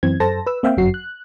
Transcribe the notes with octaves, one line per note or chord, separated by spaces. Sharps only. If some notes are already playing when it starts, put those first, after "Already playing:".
F#2 E3 C4 G#6
F#2 A4 C5 A5 A#6
B4 E6
A#3 C4 E5 F5 G5
G1 F#2 F#3 F#4 C7
F#6